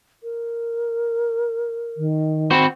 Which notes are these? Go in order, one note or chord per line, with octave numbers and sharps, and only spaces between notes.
A#4
D#3
C4 F#4 C5 B5